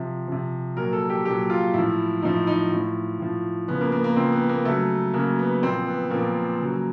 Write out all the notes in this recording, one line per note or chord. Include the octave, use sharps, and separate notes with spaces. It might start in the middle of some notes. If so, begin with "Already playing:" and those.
Already playing: C3 F3
C3 F3
A#2 F#3 A#4
A4
G4
A#2 F#3 G4
F4
A2 F3 E4
A2 F3 D#4
E4
D#4
A2 F3
A2 F3
C#3 F3 B3
A#3
A#3
A#3
C#3 F3 C4
B3
A#3
C#3 F#3 A3
C#3 F#3 A#3
B3
A#2 F3 C4
B3
A#2 F3 A#3
C#3 F#3